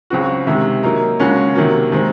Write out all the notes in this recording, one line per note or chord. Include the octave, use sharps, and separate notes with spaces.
C#2 C#3 F#3 C4 F#4
C3 D#3 G#3
F#3 A#3 D#4 A#4
D#2 C#3 G#3 C#4 F#4
C3 D#3 F#3 A#3
D#3 G#3 C4